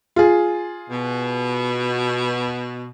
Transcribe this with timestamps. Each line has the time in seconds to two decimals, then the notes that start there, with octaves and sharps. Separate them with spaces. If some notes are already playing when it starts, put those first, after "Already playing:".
0.16 F4 G#4
0.90 B2